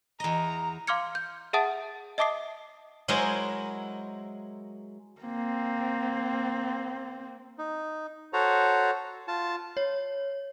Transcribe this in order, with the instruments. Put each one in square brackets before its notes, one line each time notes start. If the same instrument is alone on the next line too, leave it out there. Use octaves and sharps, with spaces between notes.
[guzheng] E2 D#5 [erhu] A#5
[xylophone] F5 C6 D6 F6 G#6 C#7
G6
G#4 E5 F#5 A5 D#6 A6
D#5 E5 A5 D6 D#6 C7
[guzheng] F#3 G#3 E4 A#4 C5 D#5
[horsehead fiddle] A#3 C4
[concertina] D#4
F#4 A4 C5 C#5 A#5
F4 A5
[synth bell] C#5